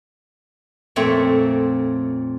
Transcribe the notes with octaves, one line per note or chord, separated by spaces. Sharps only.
F2 A#2 A3 C4 C#5